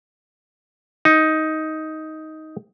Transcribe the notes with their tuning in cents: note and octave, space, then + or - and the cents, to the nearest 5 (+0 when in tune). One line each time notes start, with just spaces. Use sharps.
D#4 +10